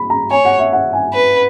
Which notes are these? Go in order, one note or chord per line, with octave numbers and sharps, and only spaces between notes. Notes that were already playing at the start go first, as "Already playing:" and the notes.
Already playing: B5
A#5
C#5 G#5
F#5
E5
F#5
G#5
B4